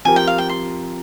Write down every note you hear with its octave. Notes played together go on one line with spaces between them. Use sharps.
F3 C4 G4 A#4 G#5
G5
F5
G5
C6